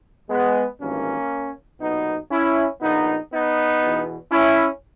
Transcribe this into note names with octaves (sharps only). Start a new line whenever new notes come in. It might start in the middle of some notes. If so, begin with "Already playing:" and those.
G#3 B3
G#1 G2 E3 A#3 C#4
B1 A#2 B3 D#4
C#4 E4
A#1 A#2 B3 D#4
B3 D#4
E2 B2
C#4 E4